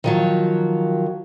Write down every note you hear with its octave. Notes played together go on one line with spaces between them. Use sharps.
D#3 F3 F#3